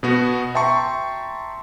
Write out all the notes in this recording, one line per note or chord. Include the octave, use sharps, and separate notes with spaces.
B2 B3 F#4
E5 G5 A5 A#5 C6 C#6